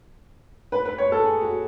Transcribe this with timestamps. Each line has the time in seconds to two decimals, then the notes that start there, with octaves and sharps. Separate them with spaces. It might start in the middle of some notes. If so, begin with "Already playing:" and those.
0.72 B4
0.85 B4
0.98 C#5
1.12 A4
1.24 G#4
1.42 F#4